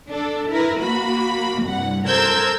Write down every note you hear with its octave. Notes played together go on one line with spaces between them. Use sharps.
D4 A4
E4 A#4 B4
A#3 F#4 B5
C2 G2 F#5
A4 A#4 C5 E6 G6 G#6